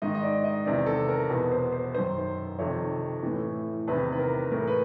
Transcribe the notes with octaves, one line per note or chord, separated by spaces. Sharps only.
G#2 D#3 D#5
D#5
D5
D#5
E2 C3 D#3 D5
A4
A#4
E2 B2 B4
C5
C5
F#2 D#3 C5
F2 C3 D#3 C#5
A2 E3
E2 C3 D#3 B4
B4
A#4
A2 E3 A#4
B4